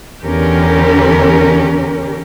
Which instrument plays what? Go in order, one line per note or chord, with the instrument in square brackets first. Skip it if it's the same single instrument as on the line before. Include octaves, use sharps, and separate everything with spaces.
[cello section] E2 D3 C#4 G4 A#4